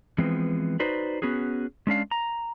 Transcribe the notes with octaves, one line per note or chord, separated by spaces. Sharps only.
E3 F3 G#3 B3 C4
D#4 F#4 B4 C5 D5
B3 C#4 F#4 G#4
G#3 C#4 D4 F5
A#5